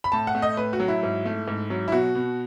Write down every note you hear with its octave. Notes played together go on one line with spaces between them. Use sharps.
B5
A2 A5
F#5
A3
D#5
A2 B4
F#4
F#3
E4
G#2
A3
G#2
F#3
E4
B2 F#4
B2